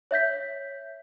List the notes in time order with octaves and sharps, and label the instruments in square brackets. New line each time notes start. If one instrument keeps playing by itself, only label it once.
[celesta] C#5 E5 G6 B6